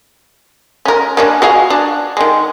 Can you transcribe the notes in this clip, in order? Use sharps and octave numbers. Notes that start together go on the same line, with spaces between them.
C#4 A#4
A#3 C#4 D4
F#4 G#4 F5
D4
D#3 G#3